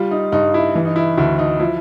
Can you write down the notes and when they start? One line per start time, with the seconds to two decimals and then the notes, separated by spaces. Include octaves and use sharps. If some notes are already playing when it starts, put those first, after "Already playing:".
Already playing: G3 F4
0.11 D#4
0.32 G2 D#4
0.54 E4
0.75 E3
0.85 D#4
0.96 E4
1.17 D2 E4
1.39 D#4
1.60 F3 E4